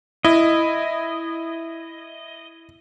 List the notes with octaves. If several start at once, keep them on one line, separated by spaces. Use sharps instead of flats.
E4 D#5